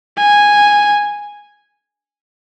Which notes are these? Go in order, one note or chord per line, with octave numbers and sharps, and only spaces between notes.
G#5